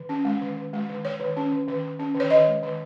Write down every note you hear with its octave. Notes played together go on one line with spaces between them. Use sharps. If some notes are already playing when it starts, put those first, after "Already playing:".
Already playing: D#3
C#4
G#3
D#3
D#3
G#3
D#3
D#3 C#5
D#3
C#4
D#3
D#3
D#3
C#4
D#3
C#5
D#3 D#5
G#3
D#3